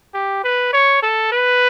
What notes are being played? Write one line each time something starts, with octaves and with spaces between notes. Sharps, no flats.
G4
B4
C#5
A4
B4